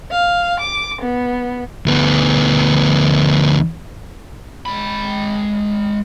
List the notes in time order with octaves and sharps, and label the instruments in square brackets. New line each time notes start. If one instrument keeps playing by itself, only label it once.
[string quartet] F5
D6
B3
[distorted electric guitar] D2 B3
[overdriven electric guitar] G#3 B5